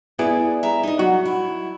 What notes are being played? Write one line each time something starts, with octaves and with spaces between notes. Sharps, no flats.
B3 E4 G#4 D5
E5 A#5
D#4 D#5
F#3 F#4
E4